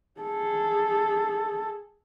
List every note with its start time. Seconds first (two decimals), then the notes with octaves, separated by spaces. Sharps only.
0.20 G#4 A4